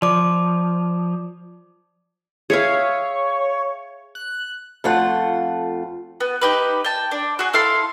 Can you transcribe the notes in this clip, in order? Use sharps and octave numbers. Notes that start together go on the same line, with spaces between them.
F3 D5 D6
G#4 C#5 E5 F5
F#6
F2 A3 F4 F#5
B3
D#4 G4 B4
G5 A5
D4
F#4 G#4
E4 A4 F5 C6